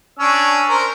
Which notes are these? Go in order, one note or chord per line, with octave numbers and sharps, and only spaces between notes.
C#4 D4 E6
A#4 C5